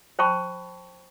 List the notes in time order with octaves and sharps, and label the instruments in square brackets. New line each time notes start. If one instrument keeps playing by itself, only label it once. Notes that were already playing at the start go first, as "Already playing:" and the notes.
[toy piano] C5 G5 A5 B5 C#6